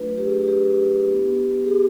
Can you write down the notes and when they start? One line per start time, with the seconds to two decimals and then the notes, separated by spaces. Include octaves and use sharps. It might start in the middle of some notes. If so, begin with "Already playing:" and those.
Already playing: F#3 A3 D4 F4 B4
0.18 G4
0.25 G#4
0.33 G4
0.48 G4
1.08 B3 E4
1.65 G#4
1.68 G4